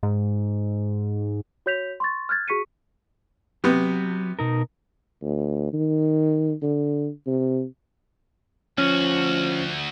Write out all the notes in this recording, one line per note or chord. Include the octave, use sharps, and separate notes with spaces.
G#2
F#4 C#5 G6 B6 F7
C6 C#6 A6
F6 F#6 G#6 A6
F#4 G#4 C#6 B6 C#7 D#7
C3 F#3 B3
B2 D#4 A#4
D2
D#3
D3
C3
D2 F3 C#4 F#4